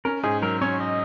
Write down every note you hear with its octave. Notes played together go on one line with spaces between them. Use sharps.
C#4 A#4
G#2 G#4
F#3 A#4
C#4 C#5
D#5